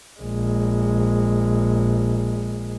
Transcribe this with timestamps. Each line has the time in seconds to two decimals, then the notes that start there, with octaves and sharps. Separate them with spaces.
0.20 A#1 G#3